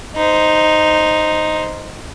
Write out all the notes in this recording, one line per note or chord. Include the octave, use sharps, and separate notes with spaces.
D#4 C5